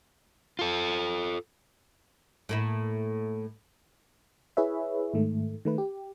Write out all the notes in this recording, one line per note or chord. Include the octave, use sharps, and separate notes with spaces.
F4 A4
A2 A#3 E4
E4 G#4 B4 C#5 E5
G#2 D#3 A3
D#3 A3 B4
G4